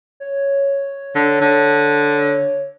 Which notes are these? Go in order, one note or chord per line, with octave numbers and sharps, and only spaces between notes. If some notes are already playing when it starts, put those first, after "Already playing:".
C#5
D3
D3